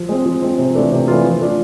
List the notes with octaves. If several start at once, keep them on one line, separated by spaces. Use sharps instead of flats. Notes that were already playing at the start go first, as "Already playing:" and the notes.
Already playing: F3
G#3 C4
F3
G#3 C4
C3
E3 A3 D4 F4
C3
E3 A3 D4 F4
F3
A3 D4 F4